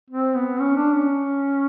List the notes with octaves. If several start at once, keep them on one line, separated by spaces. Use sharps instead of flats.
C4
B3
C#4
D4
C#4